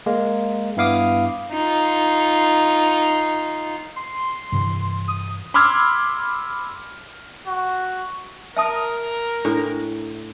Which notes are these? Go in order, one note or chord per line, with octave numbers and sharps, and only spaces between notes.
G#3 A#3
G2 B3 E4 F5 D6 D#6
D#4 F4
C6
G2 C3 E3
D#6
B5 C6 D6 E6 F6 G#6
F#4
A#4 E5 A5 D#6
A2 D4